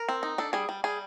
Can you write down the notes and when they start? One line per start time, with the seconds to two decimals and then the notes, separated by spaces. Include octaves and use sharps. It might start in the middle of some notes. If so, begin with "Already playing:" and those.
Already playing: A#4
0.09 C4
0.23 D#4
0.38 D4 A4
0.53 G3 G#4
0.69 G3
0.84 G3 G#4